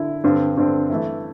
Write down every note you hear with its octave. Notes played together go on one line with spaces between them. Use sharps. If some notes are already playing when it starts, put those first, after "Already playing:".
Already playing: D3 E4
G2 D3 C4
G2 D3 C4
E3 A3 E4